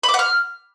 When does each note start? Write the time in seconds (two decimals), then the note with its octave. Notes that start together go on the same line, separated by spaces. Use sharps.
0.03 B5
0.09 D6
0.14 F#5
0.19 F6